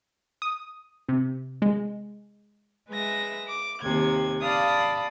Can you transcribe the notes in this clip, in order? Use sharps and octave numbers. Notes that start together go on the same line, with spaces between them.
D#6
C3
G#3
G#3 B4 E5 A#6
D6
D#2 C3 G#6
D5 F5 A5 B5 D#6